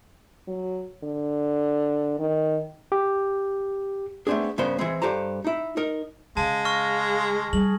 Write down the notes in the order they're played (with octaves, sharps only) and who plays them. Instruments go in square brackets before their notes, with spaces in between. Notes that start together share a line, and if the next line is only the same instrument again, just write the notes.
[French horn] F#3
D3
D#3
[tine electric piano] G4
[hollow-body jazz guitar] A3 B3 C4 D4 G#4
G2 C#3 B3 A#4 C5 C6
E3 G#3 C4
G2 G4 A4 C5 A#5
D#4 E4
D#4 A#4
[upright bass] C#3 [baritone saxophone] G#3 [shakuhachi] F5 [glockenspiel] A5
[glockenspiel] C#6 F6 A#6
[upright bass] G3 [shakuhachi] G#4 [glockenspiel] F#7